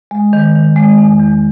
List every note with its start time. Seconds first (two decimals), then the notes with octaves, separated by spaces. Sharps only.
0.11 G#3
0.33 D#3
0.55 D#3
0.76 G#3
0.98 E2
1.19 E2